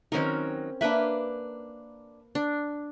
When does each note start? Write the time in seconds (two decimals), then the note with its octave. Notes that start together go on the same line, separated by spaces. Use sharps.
0.12 D#3 F#3 C4 C#4 D#4 A#4
0.81 A#3 D4 B4 E5 B5
2.35 D4